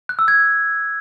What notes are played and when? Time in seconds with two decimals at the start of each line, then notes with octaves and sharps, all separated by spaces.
0.09 F#6
0.19 E6
0.28 G#6